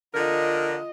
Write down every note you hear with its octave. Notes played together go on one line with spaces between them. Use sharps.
D3 F4 A#4 D#5